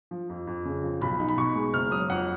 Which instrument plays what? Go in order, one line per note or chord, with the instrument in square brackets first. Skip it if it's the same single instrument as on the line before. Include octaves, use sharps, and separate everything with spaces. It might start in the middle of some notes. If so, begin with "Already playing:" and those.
[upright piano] F3
F2
F2
C#3
F3
B1 B5
D#4
B5
B2 C#6
G#3
F#1 F6
F#3 D#6
F2 F#5